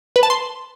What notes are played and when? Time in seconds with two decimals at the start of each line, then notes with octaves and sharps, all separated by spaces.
0.16 B4
0.23 A5
0.30 C6